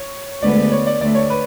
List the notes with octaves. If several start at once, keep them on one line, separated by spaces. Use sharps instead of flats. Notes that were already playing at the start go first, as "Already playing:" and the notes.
Already playing: C#5
D2 D3 G#3 B3 D5
C#5
D5
D2 D3 A3 D5
C#5
B4